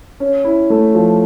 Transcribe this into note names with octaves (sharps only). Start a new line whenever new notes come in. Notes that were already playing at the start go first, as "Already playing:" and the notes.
C#4
E4
A3
F3